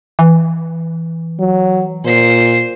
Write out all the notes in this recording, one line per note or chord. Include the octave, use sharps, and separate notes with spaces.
E3
F#3
A#2 C5 C7